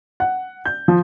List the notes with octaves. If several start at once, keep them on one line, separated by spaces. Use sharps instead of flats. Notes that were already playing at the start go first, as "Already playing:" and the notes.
F#5
G6
F3